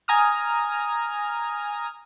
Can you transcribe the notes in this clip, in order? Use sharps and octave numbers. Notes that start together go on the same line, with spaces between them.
G#5 A#5 D#6 F6